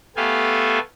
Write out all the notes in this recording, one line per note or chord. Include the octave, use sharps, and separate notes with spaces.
A3 B3 G4 A4 F5 G#5